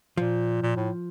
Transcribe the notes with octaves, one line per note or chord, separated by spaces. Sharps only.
A#2 F3
A#2
A2